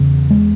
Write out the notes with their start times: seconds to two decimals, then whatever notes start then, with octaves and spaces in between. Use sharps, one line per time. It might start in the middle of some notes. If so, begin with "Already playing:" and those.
Already playing: E2 C#3
0.30 G#3